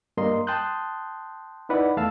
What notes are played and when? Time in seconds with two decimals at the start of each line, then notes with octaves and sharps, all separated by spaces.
0.17 G2 G3 A#3 A#4 D#5 C6
0.47 G5 A5 C6 D#6 F#6 G6
1.69 D#4 E4 B4 D5 F#5
1.97 E2 A3 F5 A5 E6